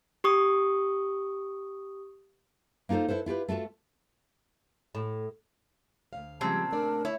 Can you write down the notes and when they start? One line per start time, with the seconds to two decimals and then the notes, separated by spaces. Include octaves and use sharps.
0.24 G4 C#6 D#6
2.89 A#3 D#4 F4 A4 C5
3.08 E4 A4 B4 C5
3.26 E4 F4 G4 B4
3.48 A3 F4 F#4 A4
4.95 A2
6.13 D2 C3 F5
6.41 A#2 C#3 F3 G3 G#3 C4 A5
6.72 A3 D4 A#4 D5
7.05 E4 C#5